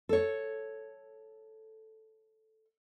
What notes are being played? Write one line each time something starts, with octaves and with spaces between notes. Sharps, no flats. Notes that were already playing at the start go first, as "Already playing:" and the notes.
A4 C#5